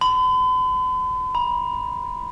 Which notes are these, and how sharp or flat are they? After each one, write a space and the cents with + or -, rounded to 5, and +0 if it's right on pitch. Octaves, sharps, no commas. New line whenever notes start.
B5 +45
B5 -40